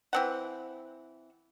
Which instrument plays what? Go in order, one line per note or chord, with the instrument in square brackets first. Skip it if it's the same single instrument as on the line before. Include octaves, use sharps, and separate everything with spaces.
[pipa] E3 C4 F#5